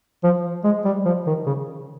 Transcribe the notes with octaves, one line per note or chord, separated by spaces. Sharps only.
F3
G#3
G3
F3
D#3
C#3